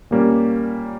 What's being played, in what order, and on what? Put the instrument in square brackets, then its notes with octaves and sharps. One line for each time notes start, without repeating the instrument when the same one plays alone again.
[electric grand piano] A#2 G3 A#3 C#4